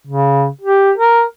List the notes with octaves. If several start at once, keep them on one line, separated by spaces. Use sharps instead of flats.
C#3
G4
A#4